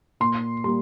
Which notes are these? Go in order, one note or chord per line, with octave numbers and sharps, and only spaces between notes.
A#2 C6
G3 A#3 C6